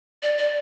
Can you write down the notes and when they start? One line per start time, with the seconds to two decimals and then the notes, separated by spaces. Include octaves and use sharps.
0.23 D5
0.38 D5